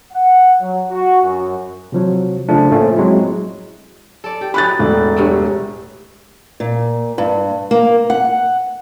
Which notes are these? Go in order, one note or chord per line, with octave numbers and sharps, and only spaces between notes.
F#5
F#3
F#4
F#2
C3 F3 F#3
C#3 F3 A3 D4
A2 F3 A3 A#3 C#4
F#3 G#3 C4 E4
A4 D5
G4
F#3 D#4 B5 F#6 A6
E1 A2
G2 C3 F#3
A#2
G2
A#3
F#5